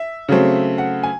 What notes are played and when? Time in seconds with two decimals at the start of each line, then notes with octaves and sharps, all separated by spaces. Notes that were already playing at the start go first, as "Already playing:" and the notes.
Already playing: E5
0.29 C#3 F#3 A3 C4
0.78 F#5
1.03 G#5